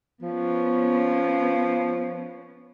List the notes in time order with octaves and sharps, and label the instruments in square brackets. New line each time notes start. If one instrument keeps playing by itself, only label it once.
[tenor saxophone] F3 [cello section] B3 C#4